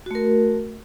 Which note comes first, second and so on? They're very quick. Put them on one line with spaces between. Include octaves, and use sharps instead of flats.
F#4 A3 A#4